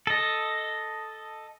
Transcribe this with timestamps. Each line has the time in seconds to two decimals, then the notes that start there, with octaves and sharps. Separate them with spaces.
0.07 A4 D#5